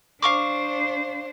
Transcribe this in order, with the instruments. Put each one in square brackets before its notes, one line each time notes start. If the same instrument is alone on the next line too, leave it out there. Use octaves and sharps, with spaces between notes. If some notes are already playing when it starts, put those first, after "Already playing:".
[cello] D4 C5 [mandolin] F5 C#6 D6